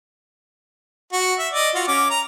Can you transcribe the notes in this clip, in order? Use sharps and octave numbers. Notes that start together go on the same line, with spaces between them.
F#4
E5
D5 D#5
F4 F#4
C#4 D6
A#5